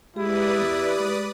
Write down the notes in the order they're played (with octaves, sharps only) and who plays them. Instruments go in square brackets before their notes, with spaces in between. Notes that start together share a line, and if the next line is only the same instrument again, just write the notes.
[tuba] G#3 [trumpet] E4 [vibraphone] G4 [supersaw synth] B4 D5 D#6
[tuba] E2
G#3